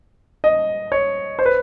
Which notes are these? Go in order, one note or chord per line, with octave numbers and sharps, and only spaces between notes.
D#5
C#5
C5
B4